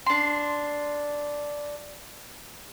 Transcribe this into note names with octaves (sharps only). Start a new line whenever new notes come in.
D4 C6